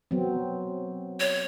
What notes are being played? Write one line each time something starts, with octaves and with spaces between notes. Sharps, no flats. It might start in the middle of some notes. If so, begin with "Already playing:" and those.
F#3 B3 C4
C#5